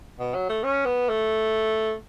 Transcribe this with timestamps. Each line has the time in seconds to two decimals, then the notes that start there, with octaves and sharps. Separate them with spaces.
0.19 B2
0.34 F#3
0.49 A3
0.63 C#4
0.85 B3
1.09 A3